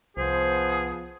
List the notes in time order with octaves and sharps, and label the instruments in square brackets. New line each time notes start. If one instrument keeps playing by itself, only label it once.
[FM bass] C2 [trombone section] F3 B3 [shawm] G#4 [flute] C5